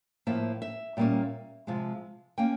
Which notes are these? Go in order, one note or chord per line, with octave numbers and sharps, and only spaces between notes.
A2 F3 A#3 E5
E5
A#2 G3 A#3 C#4
C3 F3 G#3
A#3 C#4 G5